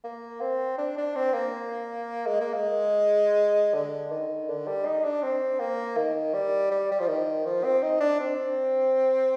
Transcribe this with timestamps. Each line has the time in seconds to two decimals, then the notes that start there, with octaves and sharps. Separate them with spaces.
0.04 A#3
0.41 C4
0.78 D4
0.97 D4
1.16 C4
1.34 A#3
2.27 G#3
2.41 A#3
2.54 G#3
3.74 D3
4.12 D#3
4.49 D3
4.67 G3
4.86 D#4
5.05 D4
5.23 C4
5.60 A#3
5.97 D#3
6.34 G3
6.71 G3
6.92 G3
7.00 F3
7.08 D#3
7.46 F3
7.64 C4
7.83 D#4
8.00 D4
8.20 C4